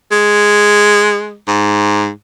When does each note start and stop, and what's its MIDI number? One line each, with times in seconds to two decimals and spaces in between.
0.11 1.37 56
1.48 2.10 44